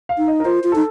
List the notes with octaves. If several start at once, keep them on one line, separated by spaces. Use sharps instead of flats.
F5
D#4
D#5
A#4
F4 C5
F4
D#4 A4